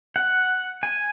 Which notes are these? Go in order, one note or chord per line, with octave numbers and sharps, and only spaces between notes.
F#5
G#5